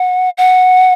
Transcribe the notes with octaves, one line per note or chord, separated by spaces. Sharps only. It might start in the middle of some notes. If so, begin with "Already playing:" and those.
Already playing: F#5
F#5